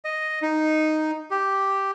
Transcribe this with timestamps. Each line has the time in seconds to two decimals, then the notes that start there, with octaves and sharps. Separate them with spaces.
0.05 D#5
0.42 D#4
1.31 G4